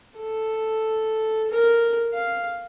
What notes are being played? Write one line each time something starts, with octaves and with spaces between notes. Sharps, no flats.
A4
A#4
F5